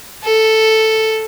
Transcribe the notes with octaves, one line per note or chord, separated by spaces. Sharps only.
A4